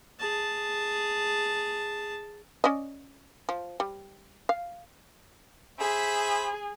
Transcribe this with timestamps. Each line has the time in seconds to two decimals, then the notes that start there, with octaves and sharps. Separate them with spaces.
0.19 G#4 A5
2.64 C#4 D5 D#5
3.49 F3
3.80 G3
4.49 F5
5.80 G#4 C5 E5 B5